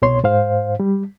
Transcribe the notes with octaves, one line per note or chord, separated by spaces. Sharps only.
C2 B2 C#5 C6
G#2 C5 F5
G3